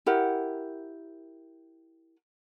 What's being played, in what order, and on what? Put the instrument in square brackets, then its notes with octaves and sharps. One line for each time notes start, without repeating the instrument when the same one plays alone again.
[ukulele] E4 G4 A#4 F#5